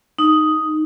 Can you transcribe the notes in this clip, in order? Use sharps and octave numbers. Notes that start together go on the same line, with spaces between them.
D#4